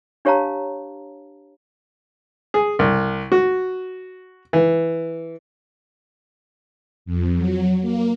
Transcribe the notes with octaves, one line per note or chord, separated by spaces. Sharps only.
D4 G4 C#5 F5 A5 A#5
G#4
C2
F#4
E3
F2
F#3
A#3